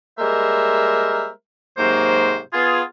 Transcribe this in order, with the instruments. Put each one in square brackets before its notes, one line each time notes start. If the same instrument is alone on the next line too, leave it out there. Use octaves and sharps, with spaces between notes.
[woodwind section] G3 G#3 A#3 A#4 C5 E5
G#2 C3 F#3 A#3 C5
B3 F4 G#4